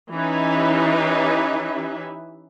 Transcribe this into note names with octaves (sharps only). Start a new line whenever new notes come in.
E3 C#4 D#4 G4 B4 E5